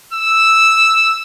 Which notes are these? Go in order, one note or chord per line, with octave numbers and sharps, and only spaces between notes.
E6